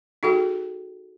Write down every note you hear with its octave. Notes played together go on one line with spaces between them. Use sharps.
D#4 F#4 G#4 A4 G5